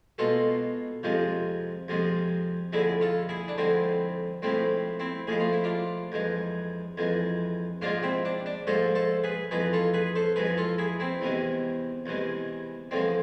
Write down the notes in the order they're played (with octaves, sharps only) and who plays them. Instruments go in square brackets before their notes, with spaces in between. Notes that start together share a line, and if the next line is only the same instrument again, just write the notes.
[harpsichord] B2 G#3 F4 A4
F2 C3 F3 G#3
F2 C3 F3 G#3
F2 D3 G#3 E4 G#4
F4 A4
E4 G#4
D4
F2 D3 G#3 C4 E4
A2 F3 G#3 C4 E4
C4 E4
A2 F3 G#3 G#4
F4
E4
D4 F4
F2 E3 G#3
F2 E3 G#3
G#2 F3 G#3 D4 F4
C4 E4
D4
D4
G#2 F3 G#3 A4 C5
A4 C5
G#4 B4
F2 E3 G#3 G#4 B4
F4 A4
G#4 B4
A4 C5
F2 E3 G#3 G#4 B4
F4 A4
E4 G#4
C4 E4
E2 C3 E3 G#3
E2 C3 E3 G#3
E2 D3 F3 G#3 C4